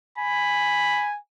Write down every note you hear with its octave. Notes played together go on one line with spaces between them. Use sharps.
G#5 B5